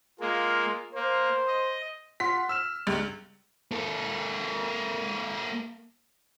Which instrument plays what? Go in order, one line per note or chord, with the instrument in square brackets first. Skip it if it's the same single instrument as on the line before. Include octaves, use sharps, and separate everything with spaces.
[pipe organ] G#3 A#3 [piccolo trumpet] F4
[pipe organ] A#3 [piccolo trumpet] C5
[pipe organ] D#5
[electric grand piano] F4 F#5 C6 [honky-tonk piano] B6
[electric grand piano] E6 F6 E7
[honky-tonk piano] C#2 G2
[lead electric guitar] A#3 A4